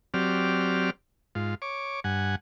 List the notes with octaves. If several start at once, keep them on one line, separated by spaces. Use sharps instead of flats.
F#3 C4 G4 D5 F6
G#2 F4
C#5 D6
G2 F#5 G#5